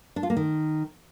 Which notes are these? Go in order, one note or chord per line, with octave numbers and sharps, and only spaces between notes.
D4
F4
A#3
D#3